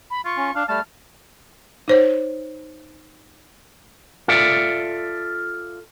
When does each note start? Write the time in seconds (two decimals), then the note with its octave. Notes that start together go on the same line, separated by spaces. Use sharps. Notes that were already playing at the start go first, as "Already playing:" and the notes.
0.10 B5
0.25 F4 C#6
0.37 C#4
0.55 D4 F5
0.68 G3 A3 A5 F6
1.88 D#4 C5 C#5
4.28 F4 A4 D5 E5